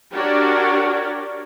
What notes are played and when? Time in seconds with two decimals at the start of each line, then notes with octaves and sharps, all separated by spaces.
0.14 D4 F#4 G4 A#4 C#5 D5